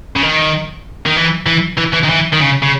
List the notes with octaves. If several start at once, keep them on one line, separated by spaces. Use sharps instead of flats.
C#3
D#3
D#3
E3
E3
E3
E3
D#3
E3
D#3
C#3
C#3